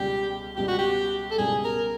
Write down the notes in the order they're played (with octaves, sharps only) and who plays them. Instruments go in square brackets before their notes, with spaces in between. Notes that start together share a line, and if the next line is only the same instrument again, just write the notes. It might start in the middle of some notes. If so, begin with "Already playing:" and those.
Already playing: [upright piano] C#2 B2 G3 [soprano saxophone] G4
[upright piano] C#2 B2 G3 [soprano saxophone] G4
[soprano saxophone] F#4
G4
A4
[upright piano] C#2 B2 G3 [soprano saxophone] G#4
[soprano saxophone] A#4